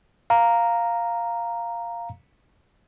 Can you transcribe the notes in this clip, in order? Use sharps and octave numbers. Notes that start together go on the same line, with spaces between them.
F5 A#5